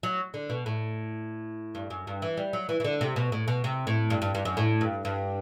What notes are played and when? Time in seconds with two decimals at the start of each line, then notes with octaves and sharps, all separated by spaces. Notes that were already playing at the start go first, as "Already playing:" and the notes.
0.03 F#3
0.34 D3
0.50 B2
0.66 A2
1.75 G2
1.90 F#2
2.07 G2
2.22 E3
2.37 G3
2.53 F#3
2.69 E3
2.80 E3
2.84 D3
3.01 C3
3.16 B2
3.32 A2
3.48 B2
3.64 C3
3.87 A2
4.10 G2
4.22 G2
4.35 G2
4.45 F#2
4.57 A2
4.81 G2
5.05 G2